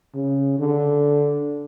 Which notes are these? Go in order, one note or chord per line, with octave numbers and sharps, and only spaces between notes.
C#3
D3